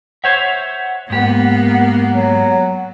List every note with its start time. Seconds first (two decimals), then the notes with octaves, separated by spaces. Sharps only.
0.24 C5 C#5 E5 F#5
1.10 G#2 A#3 B3 G4
2.13 F#3